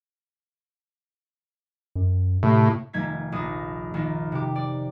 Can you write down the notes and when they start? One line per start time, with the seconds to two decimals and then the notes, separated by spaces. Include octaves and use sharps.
1.95 F#2
2.43 A2 C3
2.93 F1 D#3 A3 G#6 B6
3.32 A#1 D#6 A#6
3.94 A#1 D#3
4.32 C3 G4
4.56 D5